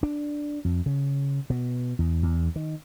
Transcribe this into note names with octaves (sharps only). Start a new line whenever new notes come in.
D4
F2
C#3
B2
E2
E2
D#3